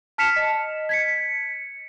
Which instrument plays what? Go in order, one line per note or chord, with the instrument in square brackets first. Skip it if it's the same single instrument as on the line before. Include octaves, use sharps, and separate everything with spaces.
[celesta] A5 F6 B6 C#7 E7 F7
D#5
G#6 B6 C#7